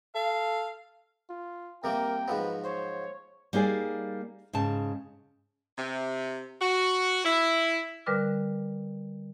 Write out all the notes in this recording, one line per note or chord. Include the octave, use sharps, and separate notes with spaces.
A4 F5
F4
C3 G3 A#3 A#4 G5
G#2 F3 F#3 B4
C5 C#5
G3 A#3 D#4 G#4 D5
G#2 C#3 A5
C3
F#4
E4
D3 G3 A#4 B4 D6 F6